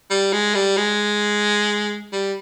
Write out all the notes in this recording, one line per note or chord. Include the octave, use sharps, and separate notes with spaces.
G3
G#3
G3
G#3
G3